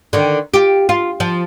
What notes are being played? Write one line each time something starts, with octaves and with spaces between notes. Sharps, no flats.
D3 D#3
F4 G4
F4
F3